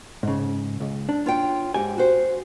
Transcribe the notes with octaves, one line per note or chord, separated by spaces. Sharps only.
G#2 C#3
C#2
D4
F4 C#5 G5
G#2 G4 G#5
F#4 C5